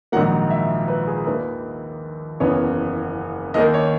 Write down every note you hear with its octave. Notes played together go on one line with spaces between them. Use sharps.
A#1 G#2 D#3 F#3 A#3 F#5
E5
B4
G#4
D#2 D#3 A#3 B4
F#1 E2 C#3 E3 B3 C#5
D#2 D#3 A#3 D#5
C#5